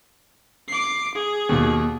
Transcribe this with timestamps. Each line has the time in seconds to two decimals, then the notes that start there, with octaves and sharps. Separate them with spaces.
0.68 D6 C7
1.15 G#4
1.49 D#2 B2